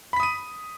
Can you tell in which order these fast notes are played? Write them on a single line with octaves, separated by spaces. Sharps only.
B5 B6 D#6 D#7